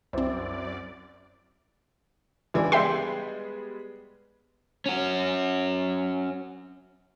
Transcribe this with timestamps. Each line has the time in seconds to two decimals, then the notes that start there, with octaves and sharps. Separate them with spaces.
0.13 C2 F#2 C4 E4 C5 D5
2.54 G#1 C#2 E3 D4
2.72 G3 G#3 B3 B4 E5 G5 C6
4.86 C#4 F#4